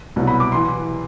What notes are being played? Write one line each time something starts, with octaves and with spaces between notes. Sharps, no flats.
C2 B2 F#3
B5
D6
C6
E3